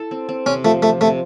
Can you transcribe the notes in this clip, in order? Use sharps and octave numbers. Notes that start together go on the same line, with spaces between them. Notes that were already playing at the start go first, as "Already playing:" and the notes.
Already playing: E4 A4
C4
C4
C3 C#4
F3 A3
F3 A3
C3 A3